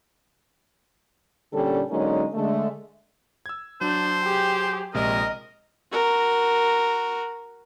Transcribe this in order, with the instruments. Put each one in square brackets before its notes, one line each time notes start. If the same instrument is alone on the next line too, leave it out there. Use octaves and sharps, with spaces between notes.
[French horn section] A#2 D3 G3 C#4 A4
D3 F#3 G#3 A#3 C#4 D#4
D3 G#3 A3
[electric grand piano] E6 G#6
[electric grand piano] F#3 [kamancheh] D4 [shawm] C5
[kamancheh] G4 G#4
[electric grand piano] A#1 C3 G#3 [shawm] A#4 [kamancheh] D#5
[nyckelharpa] F#4 A#4